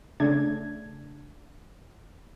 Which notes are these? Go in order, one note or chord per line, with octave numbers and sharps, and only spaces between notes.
C#3 A3 D4 G#6